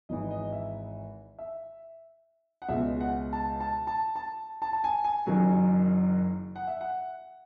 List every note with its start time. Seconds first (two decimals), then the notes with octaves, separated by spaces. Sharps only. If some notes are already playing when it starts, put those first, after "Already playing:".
0.09 G#1 G#2 E3 D#5
0.31 D#5
0.52 E5
1.39 E5
2.62 F#5
2.68 C#2 B2 G#3 E5
3.00 F#5
3.33 A5
3.60 A5
3.87 A5
4.16 A5
4.62 A5
4.73 A5
4.84 G#5
5.04 G#5
5.26 F#1 F#2 D#3 F#3 G#5
6.56 F#5
6.67 E5
6.81 F#5